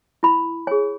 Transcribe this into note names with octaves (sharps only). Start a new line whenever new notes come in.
E4 B5
G#4 C#5 G#5